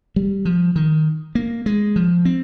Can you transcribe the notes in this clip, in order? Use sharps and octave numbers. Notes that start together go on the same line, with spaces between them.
G3
F3
D#3
A#3
G#3
F3
C4